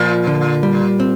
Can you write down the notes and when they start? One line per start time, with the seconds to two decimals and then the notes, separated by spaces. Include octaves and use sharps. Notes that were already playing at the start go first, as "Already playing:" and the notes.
Already playing: A#2 F3
0.27 D3
0.63 G3
1.00 C4